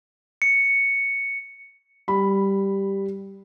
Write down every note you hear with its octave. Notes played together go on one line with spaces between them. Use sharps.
C#7
G3 B5